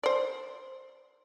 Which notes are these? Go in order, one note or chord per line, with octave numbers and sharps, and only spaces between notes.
C5 D5